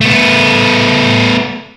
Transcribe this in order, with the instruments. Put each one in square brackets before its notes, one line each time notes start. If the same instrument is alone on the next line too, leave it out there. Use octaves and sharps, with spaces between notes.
[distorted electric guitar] A3 B3